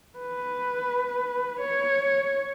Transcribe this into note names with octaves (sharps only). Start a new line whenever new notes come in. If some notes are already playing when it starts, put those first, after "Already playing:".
B4
C#5